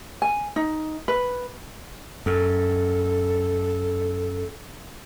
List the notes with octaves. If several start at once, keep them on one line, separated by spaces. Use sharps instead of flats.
G#5
D#4
B4
F#2 A4